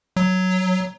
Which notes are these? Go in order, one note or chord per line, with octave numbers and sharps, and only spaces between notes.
F#3